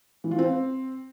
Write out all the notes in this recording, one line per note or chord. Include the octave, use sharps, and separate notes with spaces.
E3
F4
C4